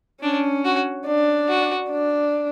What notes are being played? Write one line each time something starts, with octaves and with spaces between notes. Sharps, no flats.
C#4 D4
F#4
D4
F#4
D4